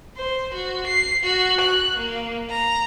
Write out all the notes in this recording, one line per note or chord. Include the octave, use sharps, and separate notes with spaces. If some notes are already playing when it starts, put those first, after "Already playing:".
C5
F#4
C7
F#4
F#6
A#3
A#5